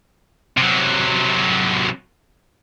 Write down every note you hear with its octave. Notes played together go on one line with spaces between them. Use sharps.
C3 F#3